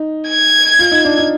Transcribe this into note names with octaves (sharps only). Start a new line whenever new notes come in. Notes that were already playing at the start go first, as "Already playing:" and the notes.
Already playing: D#4
G#6
F4
D#4
D4
D#4